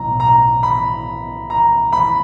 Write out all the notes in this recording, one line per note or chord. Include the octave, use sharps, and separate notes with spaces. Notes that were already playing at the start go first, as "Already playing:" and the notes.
Already playing: B1 A2 F#3 A#5
A#5
B5
A#5
B5